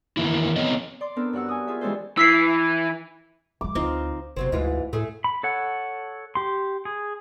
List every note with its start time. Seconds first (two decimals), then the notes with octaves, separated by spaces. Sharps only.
0.17 D#3 E3 A#3 E4
0.56 B3 C4 A4 C#5 D#5
1.01 D5 C6 D6
1.16 B3 C4 D4 A4 A#4
1.33 G2 F#3 F#5 E6
1.46 G#5 D#6 F#6
1.67 F4 G#4 E5
1.81 E3 G3 G#3 C#4 A4 C5
2.18 E3 E6 B6 C7
3.61 E3 G#3 D6
3.75 D2 C4 D#4 F4
4.36 G1 C3 F#3 C4
4.52 D2 G#2 E3 F4
4.93 A2 A3 G#4
5.24 B5
5.43 A4 C#5 F#5
6.35 G4 C6
6.85 G#4